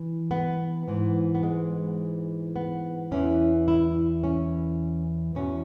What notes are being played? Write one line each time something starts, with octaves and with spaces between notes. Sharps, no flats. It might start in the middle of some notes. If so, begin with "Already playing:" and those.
Already playing: E3
B3
G#2 E3
B3
G#3
B3
E2 E3 C#4
E4
C#4
E2 B2 C#4